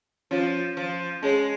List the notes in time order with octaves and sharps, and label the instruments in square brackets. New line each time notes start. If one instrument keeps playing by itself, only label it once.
[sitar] F3 [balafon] C#4 F4 C#5
[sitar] F3
[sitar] G#3 [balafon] C#4 G#4 C#5